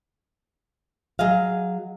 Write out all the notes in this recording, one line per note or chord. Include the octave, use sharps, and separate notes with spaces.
F#3 G#4 D#5 F5